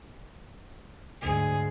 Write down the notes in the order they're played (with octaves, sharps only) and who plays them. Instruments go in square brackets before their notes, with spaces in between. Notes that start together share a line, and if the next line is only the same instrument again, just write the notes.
[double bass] D2 G#2 [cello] G#4